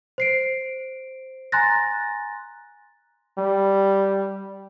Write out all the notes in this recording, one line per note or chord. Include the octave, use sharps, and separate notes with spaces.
C5 C7 D7
G#5 A#5 C6 F#6 A6 A#6
G3